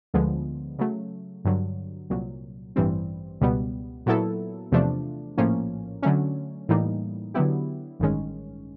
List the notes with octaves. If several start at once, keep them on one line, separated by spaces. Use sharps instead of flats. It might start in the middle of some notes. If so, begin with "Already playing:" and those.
D2 D3 F3 G#3 B3
C#3 F#3 A3
G2 D3 F#3
C2 A#2 F#3
A1 G2 E3 G3 C4
C#2 B2 G3 B3
A#2 F#3 B3 E4 A4
E2 C3 F3 A3 D4
A#1 A2 F3 A#3 C#4
D3 F#3 A3 C#4
A2 E3 G3 A#3 D#4
D3 F#3 B3 E4 G4
A1 G2 D#3 G#3 C#4